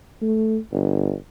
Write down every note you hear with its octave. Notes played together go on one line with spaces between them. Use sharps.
A3
G1